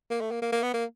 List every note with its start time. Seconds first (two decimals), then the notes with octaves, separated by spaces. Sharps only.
0.10 A#3
0.21 A3
0.31 A#3
0.42 A#3
0.52 A#3
0.63 B3
0.74 A#3